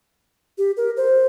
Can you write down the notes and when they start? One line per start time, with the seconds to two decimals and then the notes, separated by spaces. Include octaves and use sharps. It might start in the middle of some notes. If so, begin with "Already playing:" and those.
0.58 G4
0.77 A#4
0.97 C5